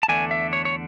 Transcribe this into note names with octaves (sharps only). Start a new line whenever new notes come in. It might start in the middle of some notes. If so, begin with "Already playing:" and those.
A5
E2 D3 A3 D4 G#5
E5
C#5
C#5